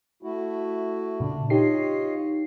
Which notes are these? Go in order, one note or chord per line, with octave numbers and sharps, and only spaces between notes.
A3 E4 F#4
A#2 C#3 D4
D#4 F4 G4 C#5 D#5 C7